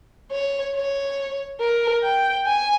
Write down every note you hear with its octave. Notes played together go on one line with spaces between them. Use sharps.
C#5
C#5
A#4
G5
G#5